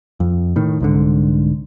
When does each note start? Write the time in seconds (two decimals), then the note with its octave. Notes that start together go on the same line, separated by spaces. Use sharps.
0.20 F2
0.56 A2 D#3
0.80 C2 G#2 D3